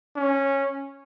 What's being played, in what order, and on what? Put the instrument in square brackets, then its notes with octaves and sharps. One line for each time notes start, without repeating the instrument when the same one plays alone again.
[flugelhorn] C#4